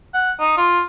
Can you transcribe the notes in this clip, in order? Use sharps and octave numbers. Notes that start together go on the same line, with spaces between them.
F#5
D#4
F4